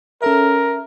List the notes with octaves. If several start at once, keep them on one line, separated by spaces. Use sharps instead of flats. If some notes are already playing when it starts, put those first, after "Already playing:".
C#4 A4 A#4 E5